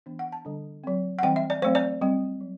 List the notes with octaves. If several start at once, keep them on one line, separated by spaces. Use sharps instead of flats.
E3 B3 D4
F#5
A5
D3 G3 D4
F#3 C4
F#5
E3 G3 C4 G5
E5
D5
F#3 A3 C4 C5
D5
G3 C4
F#3